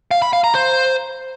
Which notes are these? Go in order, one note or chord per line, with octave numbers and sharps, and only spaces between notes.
F5
B5
F5
A#5
C5